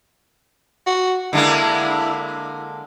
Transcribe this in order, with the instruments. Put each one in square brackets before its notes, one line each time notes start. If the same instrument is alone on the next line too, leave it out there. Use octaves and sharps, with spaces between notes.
[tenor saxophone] F#4
[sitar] D3 G#3 A#3 [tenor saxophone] E4